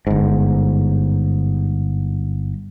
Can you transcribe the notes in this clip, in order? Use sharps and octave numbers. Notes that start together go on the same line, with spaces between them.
G1 G#2